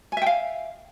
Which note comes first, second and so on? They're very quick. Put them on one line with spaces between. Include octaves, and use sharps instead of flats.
G#5 E5 G5 F5